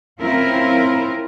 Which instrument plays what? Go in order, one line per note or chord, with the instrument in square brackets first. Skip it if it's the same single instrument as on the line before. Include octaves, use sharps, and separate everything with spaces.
[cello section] C4 C#4 E4 F4 A#4